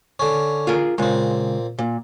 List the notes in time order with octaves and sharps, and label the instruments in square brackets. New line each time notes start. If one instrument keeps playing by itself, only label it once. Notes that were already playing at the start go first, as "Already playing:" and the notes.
[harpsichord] D3 C#4
[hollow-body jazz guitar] F4 G#4 A#4
[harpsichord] A#2 C4 [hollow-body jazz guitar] C#3 G#3
[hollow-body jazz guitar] A#2